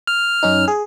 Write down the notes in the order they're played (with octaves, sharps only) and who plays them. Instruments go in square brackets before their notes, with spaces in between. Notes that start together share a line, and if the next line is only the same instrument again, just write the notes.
[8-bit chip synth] F6
[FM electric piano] F#2 C#4 D#4
G#4